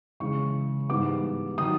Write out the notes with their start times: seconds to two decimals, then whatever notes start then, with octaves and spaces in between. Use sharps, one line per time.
0.20 C#3 E3 G#3 C#6
0.89 G#2 E3 G3 B3 D6
1.58 D#3 F#3 D#6